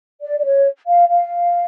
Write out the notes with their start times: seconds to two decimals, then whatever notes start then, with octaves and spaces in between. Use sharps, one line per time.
0.23 D5
0.40 D5
0.45 C#5
0.87 F5
1.09 F5